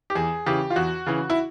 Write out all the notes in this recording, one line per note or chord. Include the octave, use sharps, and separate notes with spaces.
G4
E2 G#4
C#3 E3 G4
F4
E2 F#4
C#3 E3
E4